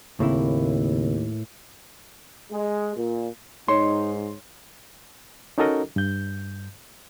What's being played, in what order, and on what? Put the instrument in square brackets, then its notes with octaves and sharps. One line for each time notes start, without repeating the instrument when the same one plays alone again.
[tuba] D#2 [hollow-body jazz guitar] A2 A#3 E4 [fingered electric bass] C#3 C4
[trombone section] G#3
A#2
[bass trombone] G#2 [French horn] D#4 [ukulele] C#5 [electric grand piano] C6
[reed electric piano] C#4 D#4 F#4 A4 A#4 D#5
G2 G6